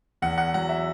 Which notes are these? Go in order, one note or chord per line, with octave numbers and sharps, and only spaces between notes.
E2 F#5
F#5
F#3 F#5
E5